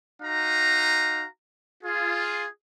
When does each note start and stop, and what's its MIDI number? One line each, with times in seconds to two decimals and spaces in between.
0.23 1.26 63
0.23 1.26 66
0.23 1.26 77
0.23 1.26 82
1.83 2.46 65
1.83 2.46 68